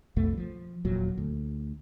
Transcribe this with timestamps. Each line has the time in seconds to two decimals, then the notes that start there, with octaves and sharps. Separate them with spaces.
0.16 B1 F2 B2 A3
0.33 F3 F#3
0.85 D#1 E2 A#2 F#3
1.18 D2